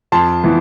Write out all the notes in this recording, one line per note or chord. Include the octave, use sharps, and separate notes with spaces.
F2 A5 C6
E3 B3